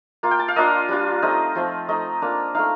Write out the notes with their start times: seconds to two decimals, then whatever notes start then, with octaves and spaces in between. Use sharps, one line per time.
0.23 A#3 F4
0.31 G5
0.39 A5
0.48 F5
0.56 A#3 D4 F4 D#5
0.89 G3 D4 F4
1.22 A3 C4 D#4 D#5
1.55 F3 A3 C4
1.89 A3 D#4 D#5
2.22 A#3 D4 F4
2.55 A3 D#4 F5